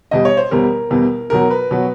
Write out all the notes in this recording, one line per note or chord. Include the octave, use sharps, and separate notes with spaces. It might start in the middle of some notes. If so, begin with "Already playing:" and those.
E2 B2 G3 D#5
C#5
C5
E2 B2 G3 A#4
E2 B2 G3
E2 B2 F#3 A#4
B4
B2 F#3